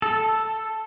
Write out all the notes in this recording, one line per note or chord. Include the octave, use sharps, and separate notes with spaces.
A4